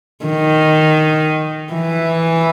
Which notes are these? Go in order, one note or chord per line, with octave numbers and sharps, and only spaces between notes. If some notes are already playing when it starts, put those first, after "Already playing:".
D#3
E3